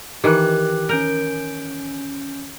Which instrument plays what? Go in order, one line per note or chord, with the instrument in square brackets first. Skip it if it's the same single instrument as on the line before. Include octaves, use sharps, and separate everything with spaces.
[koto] D#3 E3 [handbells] G4 F#6
[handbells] C#4 G6 D7 [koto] A#4